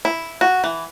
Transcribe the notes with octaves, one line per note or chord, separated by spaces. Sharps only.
E4
F#4
E3